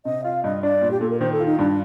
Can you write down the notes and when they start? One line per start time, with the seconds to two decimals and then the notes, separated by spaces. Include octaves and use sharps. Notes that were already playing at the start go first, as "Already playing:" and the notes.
0.05 C3 D#5
0.24 F4 F5
0.44 G2 D#5
0.63 D4 D5
0.81 A#2
0.91 G4
1.01 A#2 A4
1.10 A#4
1.20 D#3 C5
1.32 A4
1.40 F4
1.46 D#4
1.59 G2 D4